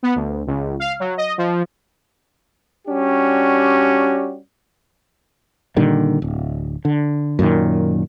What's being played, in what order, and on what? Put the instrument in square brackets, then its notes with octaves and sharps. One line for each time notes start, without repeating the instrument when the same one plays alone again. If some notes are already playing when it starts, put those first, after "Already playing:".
[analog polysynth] B3
D2
C#2
F5
F#3
D#5
F3
[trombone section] G3 C#4 D4 F#4 G4
[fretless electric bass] A#2 D3 D#3 G3
D1
D3
F#2 A#2 D3 D#3